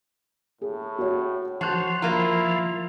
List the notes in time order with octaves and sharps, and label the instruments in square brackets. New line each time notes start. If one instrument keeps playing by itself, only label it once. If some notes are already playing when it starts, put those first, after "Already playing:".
[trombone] A2 [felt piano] G#4
[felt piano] F#4 C#5
[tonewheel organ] F3 [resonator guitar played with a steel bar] F#4 [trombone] C5 [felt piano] A5 F#6
[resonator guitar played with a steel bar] A#3 F4 [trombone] E4 [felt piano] A#5